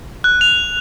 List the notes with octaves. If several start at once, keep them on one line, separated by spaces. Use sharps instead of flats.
F#6
F7